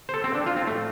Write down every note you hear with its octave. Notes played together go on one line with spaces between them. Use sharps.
C5
A4
C4
D4
F4
C4
A2 F3 A3